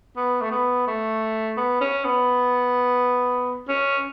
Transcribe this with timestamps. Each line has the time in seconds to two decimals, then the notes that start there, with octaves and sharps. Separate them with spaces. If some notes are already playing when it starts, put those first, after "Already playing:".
0.16 B3
0.42 A3
0.52 B3
0.87 A3
1.57 B3
1.81 C#4
2.04 B3
3.68 C#4